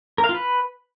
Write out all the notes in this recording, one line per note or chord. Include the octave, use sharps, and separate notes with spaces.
A#4
F5
F4
B4